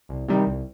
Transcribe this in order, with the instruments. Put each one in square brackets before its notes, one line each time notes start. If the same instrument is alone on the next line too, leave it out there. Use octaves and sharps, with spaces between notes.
[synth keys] C2
C3 D#3 G3
C2